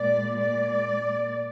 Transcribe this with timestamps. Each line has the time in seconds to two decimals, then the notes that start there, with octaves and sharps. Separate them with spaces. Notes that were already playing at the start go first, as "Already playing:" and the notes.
Already playing: A#2 G#3 D5
0.38 D5